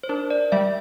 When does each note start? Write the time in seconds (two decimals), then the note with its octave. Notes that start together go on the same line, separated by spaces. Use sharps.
0.03 C5
0.09 D4 A#4
0.30 D5
0.52 G3 E5